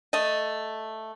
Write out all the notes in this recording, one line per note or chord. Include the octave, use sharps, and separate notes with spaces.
A3 D#5